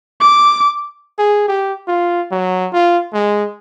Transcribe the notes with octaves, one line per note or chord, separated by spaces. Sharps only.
D6
G#4
G4
F4
F#3
F4
G#3